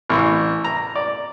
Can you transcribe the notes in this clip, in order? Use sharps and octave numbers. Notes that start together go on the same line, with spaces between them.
A1
A#5
D5